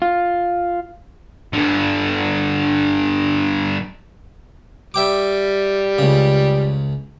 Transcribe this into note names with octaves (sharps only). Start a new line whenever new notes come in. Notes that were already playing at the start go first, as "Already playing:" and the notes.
F4
G2 D3
G3 E5 G5 D6
C#2 C#3